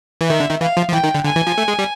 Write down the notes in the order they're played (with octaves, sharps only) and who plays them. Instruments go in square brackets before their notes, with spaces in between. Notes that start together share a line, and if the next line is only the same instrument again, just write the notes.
[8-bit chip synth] E3
[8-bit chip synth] D#3 [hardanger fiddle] E5
[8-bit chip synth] D3
D#3
[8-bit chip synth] E3 [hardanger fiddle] F5
[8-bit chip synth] F3
F3
[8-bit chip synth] E3 [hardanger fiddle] G5
[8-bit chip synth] D#3
D3
[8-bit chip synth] D3 [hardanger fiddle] G#5
[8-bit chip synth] E3
F3
A3
G#3
G3